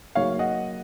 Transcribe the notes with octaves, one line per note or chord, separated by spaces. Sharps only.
C#3 F#3 A#3 D#4 C#5 F5
D#5 F#5